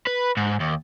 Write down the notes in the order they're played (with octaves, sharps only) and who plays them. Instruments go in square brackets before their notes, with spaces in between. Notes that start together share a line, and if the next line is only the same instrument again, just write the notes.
[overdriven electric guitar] B4
G#2
D#2